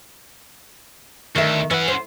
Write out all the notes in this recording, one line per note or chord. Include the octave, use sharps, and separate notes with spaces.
D2 D#3 E5
E3 C#4 F#5
C5